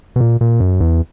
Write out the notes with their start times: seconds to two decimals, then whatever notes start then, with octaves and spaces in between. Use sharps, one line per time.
0.16 B2
0.20 A#2
0.41 A#2
0.60 F#2
0.80 E2